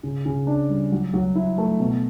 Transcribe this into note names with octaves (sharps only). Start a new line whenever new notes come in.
C#3
C#3
D4
G3
F#3
F#3
E4
A3
B2